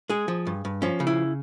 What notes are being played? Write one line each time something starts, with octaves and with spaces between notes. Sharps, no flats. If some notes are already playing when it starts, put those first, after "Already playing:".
G#3 G#4
F3
G2
G2
F3 C#4
C#3
E4